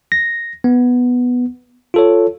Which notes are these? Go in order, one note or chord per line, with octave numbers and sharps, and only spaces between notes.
A#6
B3
F4 A4 C#5